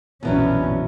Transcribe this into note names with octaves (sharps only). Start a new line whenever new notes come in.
A#1 F2 B2 E3 F#3 B3 C#4 D4